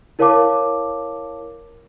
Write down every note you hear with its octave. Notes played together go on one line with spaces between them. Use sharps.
E4 A#4 C#5 F5 A5 D6